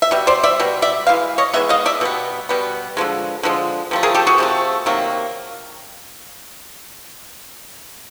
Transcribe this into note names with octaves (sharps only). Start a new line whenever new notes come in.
E5
B2 G3
C5 D5
D5 E5
B2 G3
D5 E5
E3 G#3 F5
C#5 D#5
E3 G#3 B3 E5
D#5 F5
D5 E5
B2 G3 B3
B2 G3 B3
D3 F3 G#3
D3 F3 G#3
C3 F3 A3
G#4 A#4
G4 A4
F#4 G#4
C3 F3 A3
C3 D#3 F#3 A#3